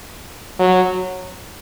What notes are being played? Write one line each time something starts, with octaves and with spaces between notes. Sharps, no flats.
F#3